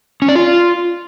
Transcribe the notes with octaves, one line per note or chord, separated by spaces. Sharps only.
C#4
D5
F4